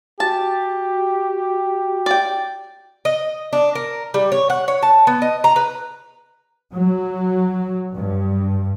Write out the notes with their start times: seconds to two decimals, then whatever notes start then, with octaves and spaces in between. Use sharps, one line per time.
0.20 F#4 G4 A5
2.06 D5 G5
3.05 D#5
3.53 D4
3.75 A#4
4.14 G3
4.32 C#5
4.50 F#5
4.68 C#5
4.83 A5
5.07 B3
5.22 D#5
5.44 A#5
5.56 B4
6.74 F#3
7.95 G2